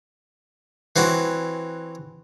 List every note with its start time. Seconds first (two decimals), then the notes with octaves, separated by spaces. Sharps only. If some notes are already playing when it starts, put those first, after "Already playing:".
0.96 E3 C4 C#4 F#4